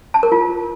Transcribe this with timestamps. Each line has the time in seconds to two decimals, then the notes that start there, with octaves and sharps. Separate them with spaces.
0.14 A5
0.23 A#4
0.32 F4